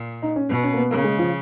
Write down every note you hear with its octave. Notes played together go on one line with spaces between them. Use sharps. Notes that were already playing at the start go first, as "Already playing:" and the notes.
Already playing: A#2
D#4
C#4
B2 B3
C#4
A#3
B3
C#3 A#3
G#3
F3